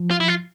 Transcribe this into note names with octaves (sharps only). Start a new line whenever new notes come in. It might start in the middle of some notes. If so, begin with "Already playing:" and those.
Already playing: F3
F4
E4
F4